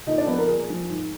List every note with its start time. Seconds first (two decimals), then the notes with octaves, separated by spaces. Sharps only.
0.06 A#2 D#4 D#5
0.17 D4 D5
0.27 F3 B3 B4
0.38 A#4
0.48 A#2 G#4
0.70 F3
0.89 G#2